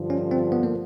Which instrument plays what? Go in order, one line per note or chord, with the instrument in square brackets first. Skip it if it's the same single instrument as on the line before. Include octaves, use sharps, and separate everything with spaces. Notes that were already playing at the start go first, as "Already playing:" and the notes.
Already playing: [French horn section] G2 D3 F3
[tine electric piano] C#4
C4
B3
A#3